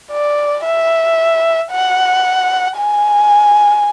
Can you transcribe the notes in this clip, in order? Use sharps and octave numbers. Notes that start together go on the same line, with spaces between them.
D5
E5
F#5
G#5